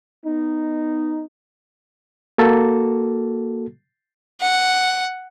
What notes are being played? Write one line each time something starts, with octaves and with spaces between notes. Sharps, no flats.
B3 D#4
A#3 F#4 A4
F#5